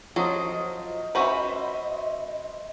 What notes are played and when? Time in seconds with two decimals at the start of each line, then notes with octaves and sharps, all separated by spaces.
0.16 F3 F#3 A4 C5 D#5 D#6
1.15 C#4 F#4 B4 C5 E5 B5